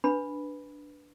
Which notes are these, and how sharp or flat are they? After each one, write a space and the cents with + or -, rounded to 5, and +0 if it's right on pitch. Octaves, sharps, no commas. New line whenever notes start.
D4 +0 B4 +0 B5 +0